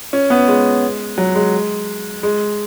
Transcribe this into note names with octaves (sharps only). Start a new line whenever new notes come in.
C#4
B3
G#3
F#3
G#3
G#3